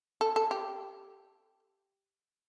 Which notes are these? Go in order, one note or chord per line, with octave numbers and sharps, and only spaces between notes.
A4
A4
G4